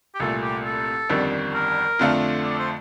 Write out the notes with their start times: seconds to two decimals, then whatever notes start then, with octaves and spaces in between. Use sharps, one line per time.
0.15 G4
0.20 C2 A#2 A3 A4
0.42 G4
0.65 A4
1.10 G1 F2 D#3 G3 D4
1.54 A#4
1.99 F2 D3 A3 D4 F4
2.44 D5
2.59 C5